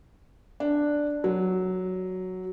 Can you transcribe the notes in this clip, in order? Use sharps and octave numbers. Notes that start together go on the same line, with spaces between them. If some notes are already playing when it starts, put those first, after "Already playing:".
D4
F#3